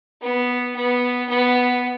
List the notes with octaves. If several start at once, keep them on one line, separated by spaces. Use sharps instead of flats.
B3
B3
B3